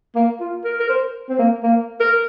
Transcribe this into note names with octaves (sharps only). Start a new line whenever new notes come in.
A#3
F4
A#4
A#4
C5
C4
A#3
A#3
A#4